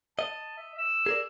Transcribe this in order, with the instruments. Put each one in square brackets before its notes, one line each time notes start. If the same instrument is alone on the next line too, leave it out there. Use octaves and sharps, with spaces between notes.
[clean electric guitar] D#5 [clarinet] A5
[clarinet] E5
E6
[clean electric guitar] G#4 A#4 D5